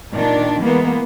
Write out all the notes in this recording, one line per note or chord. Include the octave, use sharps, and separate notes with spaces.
A#2 D#3 D4
E3 G#3 A#3 B3